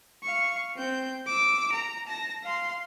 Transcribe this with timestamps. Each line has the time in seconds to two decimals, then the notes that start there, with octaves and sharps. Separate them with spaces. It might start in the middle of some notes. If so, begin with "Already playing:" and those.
0.23 F5 C#6
0.76 C4 G6
1.27 D6 E6
1.72 A#5
2.07 A5 A#6
2.44 F5 C6